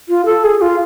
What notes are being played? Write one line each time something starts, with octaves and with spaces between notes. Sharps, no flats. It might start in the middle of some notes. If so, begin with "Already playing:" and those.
F4
A4
G#4
F4